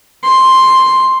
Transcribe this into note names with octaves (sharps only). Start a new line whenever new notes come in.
C6